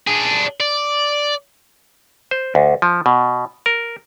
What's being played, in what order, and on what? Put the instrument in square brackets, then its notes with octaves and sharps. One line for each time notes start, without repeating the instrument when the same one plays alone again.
[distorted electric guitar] D4 G#4
D5
[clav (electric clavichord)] C5
D2
F3
B2
A#4